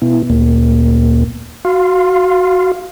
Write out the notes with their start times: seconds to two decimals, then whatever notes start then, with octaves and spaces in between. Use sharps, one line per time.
0.02 B2 B3 E4
0.30 D2 A#2 A#3
1.65 F#4 F5 C6